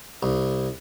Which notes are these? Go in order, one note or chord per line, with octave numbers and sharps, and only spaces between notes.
C2